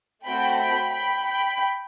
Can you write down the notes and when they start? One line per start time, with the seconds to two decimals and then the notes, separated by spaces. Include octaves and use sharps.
0.25 A3 C4 F#4 A4 G5 B5
0.58 G5 B5
0.91 G5 B5
1.25 G5 B5